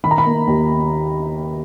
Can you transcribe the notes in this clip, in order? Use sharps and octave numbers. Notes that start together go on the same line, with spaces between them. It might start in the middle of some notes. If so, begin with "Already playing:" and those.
D#3 B5
A#5
B5
A#3
D#2